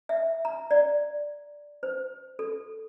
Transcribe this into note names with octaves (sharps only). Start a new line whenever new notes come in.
E5
A#5
D5
C5
A4